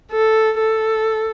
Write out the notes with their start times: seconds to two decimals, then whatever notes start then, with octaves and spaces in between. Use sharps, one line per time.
0.11 A4
0.58 A4